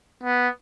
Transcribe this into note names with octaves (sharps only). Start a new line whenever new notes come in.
B3